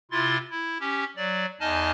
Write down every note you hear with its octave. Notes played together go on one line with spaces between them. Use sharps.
C3 E4 F4 C6 A6
E4
C#4 G4
F#3 D5
E2 D#4 D#5 G#5 A5 F6